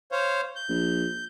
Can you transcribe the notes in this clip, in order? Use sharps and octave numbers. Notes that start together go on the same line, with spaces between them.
C5 C#5 F5
G6
A#1